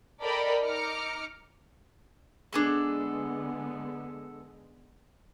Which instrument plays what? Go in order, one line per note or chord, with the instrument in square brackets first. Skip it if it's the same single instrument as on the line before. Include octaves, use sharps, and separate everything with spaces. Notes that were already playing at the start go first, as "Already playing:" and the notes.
[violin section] A4 A#4 D5 D#5 G5 B5
D#4 A#5 D6 F6 C#7
[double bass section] D3 G#3 B3 [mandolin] D4 G#4 A4